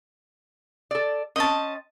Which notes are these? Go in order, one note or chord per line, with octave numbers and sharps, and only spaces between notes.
A4 D5
C4 C#4 D#5 A5